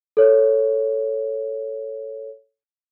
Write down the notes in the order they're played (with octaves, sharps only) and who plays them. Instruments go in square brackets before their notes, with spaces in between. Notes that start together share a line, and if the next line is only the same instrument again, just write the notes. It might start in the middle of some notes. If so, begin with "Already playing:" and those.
[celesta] A4 C#5